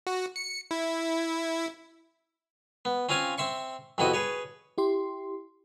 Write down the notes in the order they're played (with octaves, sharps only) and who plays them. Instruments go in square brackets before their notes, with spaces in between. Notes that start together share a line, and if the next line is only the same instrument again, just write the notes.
[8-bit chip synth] F#4
C#7
E4
[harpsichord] B3
C4 C#4 F4 F5 G#5 C6
C4 E5 C6 C#6
F2 C3 B3 E4 F#4 D#5
G#4 B4 C#5
[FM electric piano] E4 G4 C6